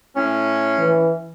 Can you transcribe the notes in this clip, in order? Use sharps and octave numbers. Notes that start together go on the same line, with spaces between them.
A2 C#4
E3